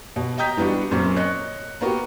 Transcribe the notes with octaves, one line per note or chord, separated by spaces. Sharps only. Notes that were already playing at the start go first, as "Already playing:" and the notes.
B2
D#5 G5 A#5 D#6 G6 B6
E3 G3 B3 D4 F#4
F#2 A#2 C4 C#4
C#5 D#5 F#6
A#3 B3 F#4 G4